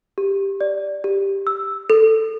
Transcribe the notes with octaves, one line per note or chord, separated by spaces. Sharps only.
G4
D5
G4
E6
A4